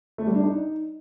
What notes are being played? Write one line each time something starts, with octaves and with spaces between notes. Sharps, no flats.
A3
G3
D4
D#4